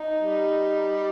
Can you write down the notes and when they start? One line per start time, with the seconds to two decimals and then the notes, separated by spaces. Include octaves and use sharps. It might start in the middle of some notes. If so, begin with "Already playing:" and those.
Already playing: D#4
0.17 G3